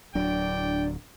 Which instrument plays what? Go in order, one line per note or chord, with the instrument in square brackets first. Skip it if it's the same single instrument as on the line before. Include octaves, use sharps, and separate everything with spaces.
[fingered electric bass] D1 F#3 [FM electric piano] D4 [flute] D5 [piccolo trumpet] G5